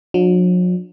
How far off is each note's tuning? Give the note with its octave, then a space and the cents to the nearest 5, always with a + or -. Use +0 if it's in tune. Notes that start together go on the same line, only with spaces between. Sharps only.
F#3 -45 D4 +20